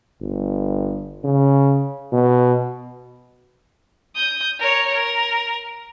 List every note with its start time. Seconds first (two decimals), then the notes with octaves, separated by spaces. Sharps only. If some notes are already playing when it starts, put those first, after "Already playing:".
0.21 G1
1.24 C#3
2.12 B2
4.15 D#6 G6
4.59 A#4 C#5
4.94 A#4